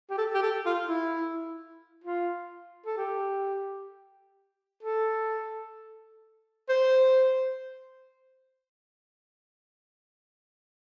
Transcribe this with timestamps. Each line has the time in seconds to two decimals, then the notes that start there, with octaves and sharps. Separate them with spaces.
0.10 G4
0.18 A4
0.35 G4
0.42 A4
0.65 F4
0.88 E4
2.04 F4
2.86 A4
2.97 G4
4.83 A4
6.69 C5